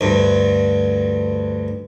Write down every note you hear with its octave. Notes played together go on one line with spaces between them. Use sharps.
D2 G2